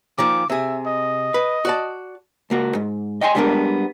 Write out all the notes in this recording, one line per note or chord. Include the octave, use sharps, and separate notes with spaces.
A#2 D#3 F3 D6
C3 G#4 E5
D#5
B4
F#4 D5 A5
C#2 A#3 F#4
G#2
D#5 G5 G#5 C6
G3 G#3 B3 D4 F#4 A#4